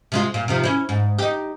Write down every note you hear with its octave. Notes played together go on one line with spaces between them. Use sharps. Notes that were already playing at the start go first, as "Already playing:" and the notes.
C3 G#3 F4
A#2
C3 D#3 F3
C#4 E4
G#2
D#4 G4